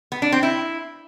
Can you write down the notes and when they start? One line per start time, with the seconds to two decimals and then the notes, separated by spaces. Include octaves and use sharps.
0.12 B3
0.22 D4
0.32 C4
0.43 E4